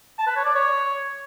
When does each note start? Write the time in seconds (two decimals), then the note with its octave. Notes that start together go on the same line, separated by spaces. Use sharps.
0.18 A5
0.27 B4
0.36 C#5
0.45 D5
0.54 C#5